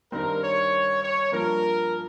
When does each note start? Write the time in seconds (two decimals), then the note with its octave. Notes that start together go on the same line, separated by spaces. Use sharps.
0.12 G2 D#3 G3 C4 A#4
0.42 C#5
1.03 C#5
1.32 G2 F3 A#3 A#4